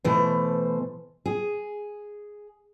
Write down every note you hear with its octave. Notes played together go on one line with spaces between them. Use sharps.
B2 E3 A3 C5
G#4